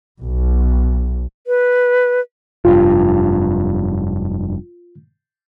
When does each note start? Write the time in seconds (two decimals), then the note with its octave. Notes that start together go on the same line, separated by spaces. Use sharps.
0.22 B1
1.47 B4
2.65 F1 G2 F4